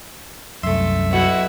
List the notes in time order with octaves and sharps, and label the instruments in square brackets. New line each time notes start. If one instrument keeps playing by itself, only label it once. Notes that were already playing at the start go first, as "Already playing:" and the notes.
[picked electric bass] C2 F#2 [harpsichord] A3 C6 [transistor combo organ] E5
[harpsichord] B1 B2 [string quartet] E4 F#4 F#5